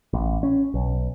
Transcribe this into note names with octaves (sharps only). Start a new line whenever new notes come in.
A1
C#4
B1